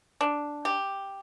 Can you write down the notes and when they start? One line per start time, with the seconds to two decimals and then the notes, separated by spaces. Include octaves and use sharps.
0.21 D4
0.65 G4